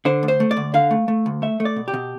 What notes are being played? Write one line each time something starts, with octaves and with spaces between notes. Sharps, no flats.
D3 C5
D2
C5
A3
D5
D2
D3 F5
A3
A3
D2
A3 E5
A3
D5
B2
G4
B2